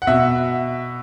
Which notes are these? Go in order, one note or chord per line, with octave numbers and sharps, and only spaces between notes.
F#5
B2 E5